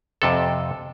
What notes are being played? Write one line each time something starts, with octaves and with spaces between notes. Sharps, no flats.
F2 C3 A4